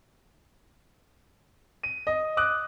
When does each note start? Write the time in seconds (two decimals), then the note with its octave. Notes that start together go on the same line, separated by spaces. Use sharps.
1.83 D#7
2.07 D#5
2.37 D6 D#6 F#6